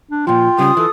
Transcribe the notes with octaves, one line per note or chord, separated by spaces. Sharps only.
D4
A#2 F3 F4 G5
C#3 G3 D#6
E3 A4